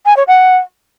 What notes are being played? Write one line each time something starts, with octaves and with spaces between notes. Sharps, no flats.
G#5
C#5
F#5